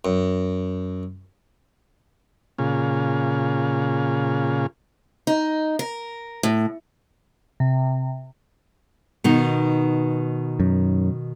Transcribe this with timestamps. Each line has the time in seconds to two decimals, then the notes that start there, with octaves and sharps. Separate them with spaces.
0.05 F#2
2.58 A#2 C#3 F4 G#4
5.27 D#4
5.79 A#4
6.43 A2
7.60 C3
9.24 B2 D#3 D#4
10.60 F#2